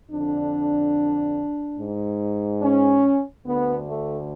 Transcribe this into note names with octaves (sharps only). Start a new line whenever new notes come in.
F2 D3 D4
G#2
C#4
D2 D3 B3
A3